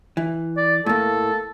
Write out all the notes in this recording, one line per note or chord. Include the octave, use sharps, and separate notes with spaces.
E3
D5
A2 A#3 A4